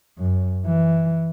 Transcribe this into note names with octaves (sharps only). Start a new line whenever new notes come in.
F#2
E3